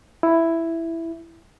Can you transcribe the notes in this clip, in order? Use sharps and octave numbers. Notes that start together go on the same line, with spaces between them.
E4